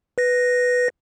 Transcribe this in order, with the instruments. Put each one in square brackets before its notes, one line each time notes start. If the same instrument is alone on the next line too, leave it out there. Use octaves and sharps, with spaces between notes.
[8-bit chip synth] B4 A#6